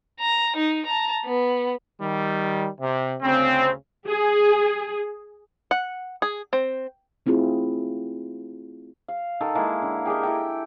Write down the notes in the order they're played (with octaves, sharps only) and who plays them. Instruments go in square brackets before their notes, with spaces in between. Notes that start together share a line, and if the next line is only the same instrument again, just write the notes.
[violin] A#5
D#4
A5 A#5
B3
[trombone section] D#3 G3
C3
[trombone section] D2 C#3 [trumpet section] C4
[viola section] G#4
[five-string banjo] F#5
G#4
C4
[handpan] A3 C4 E4 F4 G#4
[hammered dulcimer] F5
D#3 A4
G#3 A#3 E4
D3
G4 G#4 A#4 D#5
E4 A4 G5